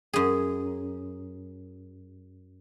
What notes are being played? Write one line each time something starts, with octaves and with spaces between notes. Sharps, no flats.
F#2 G#4